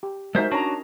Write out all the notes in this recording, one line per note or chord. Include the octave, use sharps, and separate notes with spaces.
G4
G#3 D#4 F#4 A#4 C5 E5
C#4 D4 F#4 C#5 A#5